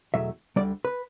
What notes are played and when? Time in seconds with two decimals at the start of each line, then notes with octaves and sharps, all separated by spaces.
0.14 E2 B2 F#3 A3 E5
0.56 D2 D3 G3 D5
0.85 B4